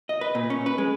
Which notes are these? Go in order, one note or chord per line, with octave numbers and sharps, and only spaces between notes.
D#5
B4
A#2
C#4
B4
G#3